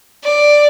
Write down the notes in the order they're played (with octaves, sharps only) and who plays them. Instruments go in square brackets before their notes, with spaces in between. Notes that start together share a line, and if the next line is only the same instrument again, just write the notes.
[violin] D5